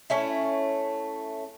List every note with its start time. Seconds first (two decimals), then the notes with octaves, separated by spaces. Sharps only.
0.10 A3 C#4 E4